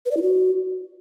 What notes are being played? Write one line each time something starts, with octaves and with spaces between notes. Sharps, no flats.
B4
D5
E4
F#4